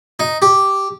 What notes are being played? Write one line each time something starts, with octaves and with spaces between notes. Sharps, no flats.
D#4
G4